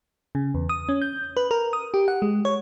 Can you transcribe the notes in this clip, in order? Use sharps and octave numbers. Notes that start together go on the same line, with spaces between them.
C#3
E2
D#6
C#4
G6
B4
A#4
D#6
G4
F#5
G#3
C#5